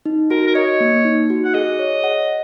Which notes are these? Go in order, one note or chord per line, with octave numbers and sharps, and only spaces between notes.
D#4
F#4 A#4
A#4
C#5 D#5
A#3
D#4
F#4
F#5
G#4 D#5
C#5
F#5